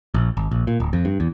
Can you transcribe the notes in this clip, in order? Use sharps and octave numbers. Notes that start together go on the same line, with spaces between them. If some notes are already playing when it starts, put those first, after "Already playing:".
A#1
G#1
A#1
A#2
D1
F2
G2
E2